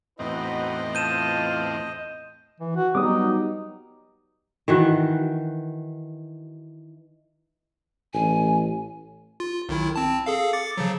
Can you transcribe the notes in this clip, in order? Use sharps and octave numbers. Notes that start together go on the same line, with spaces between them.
E2 A2 C4 D#4 F#4 B4 D#5
F4 A5 G6 D#7 E7
E3
F#4
F#3 G3 B3 D#4 D6 D#6
D#3 E3 F#4
A1 G#5
F4
B1 D#3 E4
C4 A5
G#4 A4 F5
D6 A6 C#7
C#3 F3 F#3